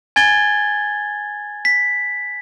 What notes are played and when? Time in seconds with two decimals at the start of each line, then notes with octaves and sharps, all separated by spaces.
0.16 G#5 G#6 A6 G7
1.65 B6